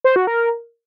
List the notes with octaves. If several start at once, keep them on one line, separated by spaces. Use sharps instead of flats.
C5
F#4
A#4